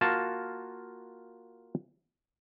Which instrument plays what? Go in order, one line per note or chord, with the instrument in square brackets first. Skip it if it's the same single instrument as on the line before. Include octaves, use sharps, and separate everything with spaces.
[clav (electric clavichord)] A#3 F4 F#4 A5